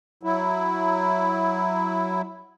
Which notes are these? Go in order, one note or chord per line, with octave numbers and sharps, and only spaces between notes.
F#3 E4